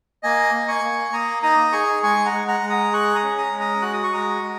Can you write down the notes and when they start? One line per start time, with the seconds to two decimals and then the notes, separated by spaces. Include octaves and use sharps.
0.23 A#3 D#5 G#5
0.54 A#3
0.68 G#5 C#6
0.84 A#3
1.13 A#3 A#5 D#6
1.43 D#4 A#5 D#6
1.73 G#4 G#5 C#6
2.03 G#3 G#5 C#6
2.25 F#5 A#5
2.33 G#3
2.48 F#5 A#5
2.63 G#3
2.70 A#5 D#6
2.92 G#4 C#6 F#6
3.15 A#5 D#6
3.23 C#4
3.38 A#5 D#6
3.52 G#3
3.59 A#5 D#6
3.82 F#4 F#6
3.93 D#6
4.03 C#6
4.12 G#3 A#5 D#6
4.42 G#3